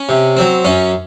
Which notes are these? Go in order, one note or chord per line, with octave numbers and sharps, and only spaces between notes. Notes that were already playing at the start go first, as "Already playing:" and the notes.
Already playing: C#4
C3
F#3 C4
F#2 C#4